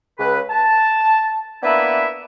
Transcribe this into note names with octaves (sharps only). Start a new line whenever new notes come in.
C#2 B4
A5
A#3 B3 D4 E4 B4 E5